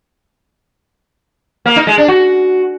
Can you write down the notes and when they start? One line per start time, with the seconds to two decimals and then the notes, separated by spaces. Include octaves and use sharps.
1.66 A#3
1.76 D#4
1.87 G#3
1.98 D4
2.08 F#4